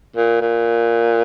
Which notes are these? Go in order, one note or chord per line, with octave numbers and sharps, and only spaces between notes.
A#2
A#2